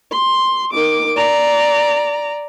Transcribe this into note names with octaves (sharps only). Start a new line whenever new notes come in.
C6
D#3 D6
D5 A#5